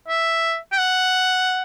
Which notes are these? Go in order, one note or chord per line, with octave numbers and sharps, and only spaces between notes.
E5
G5
F#5